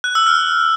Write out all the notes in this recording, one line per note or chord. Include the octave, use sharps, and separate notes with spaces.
F#6
E6
F6